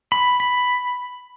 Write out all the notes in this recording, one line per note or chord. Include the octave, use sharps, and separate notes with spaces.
B5
B5